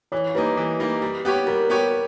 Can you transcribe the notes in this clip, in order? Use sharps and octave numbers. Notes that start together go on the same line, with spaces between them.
E3 C#5
G3 A#3 D#4 B4
E3
G3 A#3 D#4
G3
B3 G4 C#5
G3 A#4
B3 G4 C#5